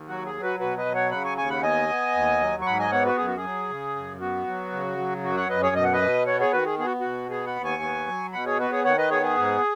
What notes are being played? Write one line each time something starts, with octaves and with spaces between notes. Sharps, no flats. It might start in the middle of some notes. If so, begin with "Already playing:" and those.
Already playing: D#2
F#3 F#4
G#4
F#3
F#4 B4
B2 F#4 B4
B4 D#5
F#3
C#5 F#5
C#3 F#5 B5
G#5 C#6
D#2 G#5 C#6
F#5 B5
B3 D#5 G#5
B3
D#2
F#3
C#6
G#2 F#5 B5
D#5 G#5
B3 C#5 F#5
F#4 B4
F#2 G#4
F#4
G#4
F#3
C#3
F#2
B3 F#4
F#3
C#3
F#3
F#2 F#4
C#5 F#5
F#2 B4 D#5
G#4 C#5
B2 D#5
F#5
B4 D#5
B2
B3 C#5 F#5
G#4 C#5
D#3 F#4 B4
G#4
B3 G#4
F#4
B2 F#4
B3 G#4
F#5 B5
D#2
G#5 C#6
B3
F#3
B2 F#5 B5
G#4 C#5
B3 F#4 B4
G#4 C#5
D#3 C#5 F#5
B4 D#5
B3 G#4 C#5
G#4
G#2